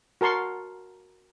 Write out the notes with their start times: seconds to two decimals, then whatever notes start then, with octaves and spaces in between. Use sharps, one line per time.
0.21 F#4 A#4 A5 C6 C#6